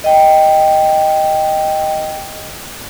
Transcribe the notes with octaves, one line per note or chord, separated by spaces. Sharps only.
D#5 G5